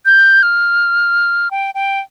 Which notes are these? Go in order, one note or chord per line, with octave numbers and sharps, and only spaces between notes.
G6
F6
G5
G5